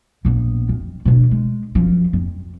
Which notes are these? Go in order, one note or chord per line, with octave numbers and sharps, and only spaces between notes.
A#1 B3
F2
B2 D3
G#3
F#2 F3
F2